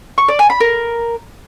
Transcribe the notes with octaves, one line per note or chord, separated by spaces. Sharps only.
C#6
D5
G#5
B5
A#4